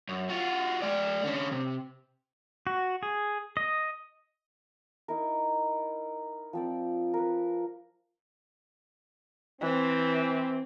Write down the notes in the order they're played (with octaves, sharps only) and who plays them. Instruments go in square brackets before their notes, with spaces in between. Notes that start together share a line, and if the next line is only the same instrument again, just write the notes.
[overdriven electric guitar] F#2
F4 F#4
G#3 D5
D3 C#4
C3
[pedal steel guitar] F#4
G#4
D#5
[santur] D#4 E4 A#4
F3 C4 D5
A#4 B4
[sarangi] E3 [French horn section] C4